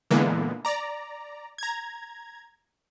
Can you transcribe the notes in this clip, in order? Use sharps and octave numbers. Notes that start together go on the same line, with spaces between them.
A#2 D3 E3 G#3 A#3 B3
D5 A#5
A#5 G#6